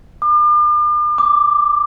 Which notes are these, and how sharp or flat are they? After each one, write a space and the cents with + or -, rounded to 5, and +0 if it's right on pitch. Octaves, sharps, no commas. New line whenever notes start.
D6 +40
D6 +0